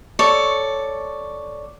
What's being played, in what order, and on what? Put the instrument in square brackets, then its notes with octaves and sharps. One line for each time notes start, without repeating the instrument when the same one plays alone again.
[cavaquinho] A4 C#5 D5 C#6